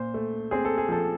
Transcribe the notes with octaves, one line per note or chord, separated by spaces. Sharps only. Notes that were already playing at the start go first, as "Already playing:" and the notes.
Already playing: A#2 C5
A3
C4 G#4
A4
G#4
F3 A4